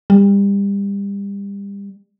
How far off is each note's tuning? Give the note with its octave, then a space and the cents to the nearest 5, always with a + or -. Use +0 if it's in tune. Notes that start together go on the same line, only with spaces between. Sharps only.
G3 +30